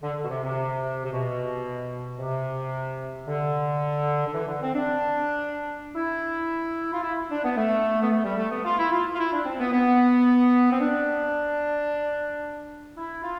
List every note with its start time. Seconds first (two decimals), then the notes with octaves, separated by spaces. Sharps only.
0.03 D3
0.17 D3
0.23 B2
0.30 C3
0.44 C3
1.05 C3
1.11 B2
2.18 C3
3.26 D3
4.26 D3
4.34 E3
4.47 D3
4.61 C4
4.74 D4
5.95 E4
6.93 F4
7.03 E4
7.30 D4
7.44 B3
7.57 A3
8.01 B3
8.11 A3
8.24 G3
8.37 A3
8.51 B3
8.64 F4
8.78 E4
8.91 F4
9.14 F4
9.19 E4
9.32 D4
9.46 C4
9.59 B3
9.72 B3
10.71 C4
10.80 D4
12.96 E4
13.23 F4